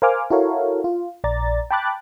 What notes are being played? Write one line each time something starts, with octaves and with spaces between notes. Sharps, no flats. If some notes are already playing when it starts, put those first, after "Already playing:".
A#4 C5 F5 G#5 D6 F6
E4 F#4 A4 A#4 C#5 F5
F4
A#1 D5 A#5 A6
G5 A5 B5 D6 F#6 A6